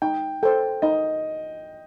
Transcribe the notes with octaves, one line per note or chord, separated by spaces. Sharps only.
D#4 G5
A4 C5 G5
D#4 D#5